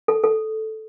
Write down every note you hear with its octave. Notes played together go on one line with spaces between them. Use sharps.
A4
A4